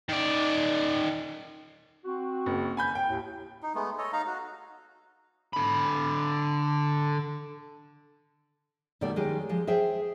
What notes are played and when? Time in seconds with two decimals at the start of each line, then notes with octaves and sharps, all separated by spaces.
0.09 D#3 D5
2.05 C4 F#4
2.46 F#1
2.77 G#5 B5 G6
2.95 G5
3.08 D#2 A2
3.63 D#4
3.75 G#3 A3 B3
3.98 A4 C#5 D#5
4.13 D#4 F5 A#5
4.27 F#4
5.53 D3 B5
9.01 B2 D#3 G3 A3 D5
9.16 D#3 G#3 C#4 G4
9.49 F3 G#3
9.67 G#4 C5 E5 G5